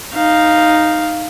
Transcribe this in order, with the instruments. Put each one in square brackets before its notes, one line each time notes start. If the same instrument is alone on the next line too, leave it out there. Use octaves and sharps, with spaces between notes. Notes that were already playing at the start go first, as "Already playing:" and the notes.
[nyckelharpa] D#4 F5